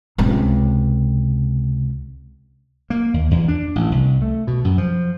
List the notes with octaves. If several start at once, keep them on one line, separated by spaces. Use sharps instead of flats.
C#2 C3
A#3
D#2
E2
D4
A1
C2
A3
B2
F#2
F3